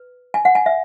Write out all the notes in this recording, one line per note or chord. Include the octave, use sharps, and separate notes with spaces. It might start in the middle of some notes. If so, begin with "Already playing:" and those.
Already playing: B4
G#5
F#5
G#5
E5